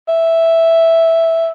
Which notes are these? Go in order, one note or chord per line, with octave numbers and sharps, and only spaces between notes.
E5